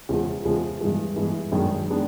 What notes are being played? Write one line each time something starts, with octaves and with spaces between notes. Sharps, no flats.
E2 C#3 F3 G#3
E2 C#3 F3 G#3
G2 E3 G#3 B3
G2 E3 G#3 B3
F#2 D#3 G#3 B3 D4
D#3 G#3 B3 D4